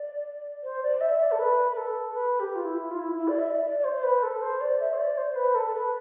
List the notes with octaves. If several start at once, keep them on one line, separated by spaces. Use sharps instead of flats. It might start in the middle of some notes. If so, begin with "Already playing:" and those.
Already playing: D5
C5
D5
E5
D5
A4
B4
B4
A4
B4
G4
F4
E4
F4
E4
E4
D5
E5
D5
D5
D5
C5
C5
B4
A4
C5
D5
E5
C5
D5
C5
B4
A4
B4